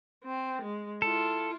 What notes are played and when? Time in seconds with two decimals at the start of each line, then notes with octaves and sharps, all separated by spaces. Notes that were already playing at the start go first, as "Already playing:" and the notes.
0.23 C4
0.62 G#3
1.02 E4 F4 A4